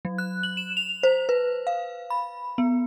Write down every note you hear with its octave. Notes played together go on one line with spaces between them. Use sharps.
F#3
F#6
F#7
E7
F7
C5
B4
F5
B5
B3